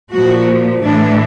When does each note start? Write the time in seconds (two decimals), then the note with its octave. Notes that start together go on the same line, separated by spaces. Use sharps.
0.13 A#2 F3 F#4
0.81 A2 E3 D4